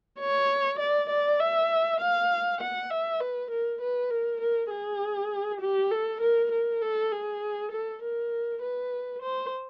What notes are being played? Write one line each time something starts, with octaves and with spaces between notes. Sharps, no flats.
C#5
D5
D5
E5
F5
F#5
E5
B4
A#4
B4
A#4
A#4
G#4
G4
A4
A#4
A#4
A4
G#4
A4
A#4
B4
C5